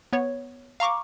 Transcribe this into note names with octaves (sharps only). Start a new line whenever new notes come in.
B3 C#5
F5 A#5 C#6 D6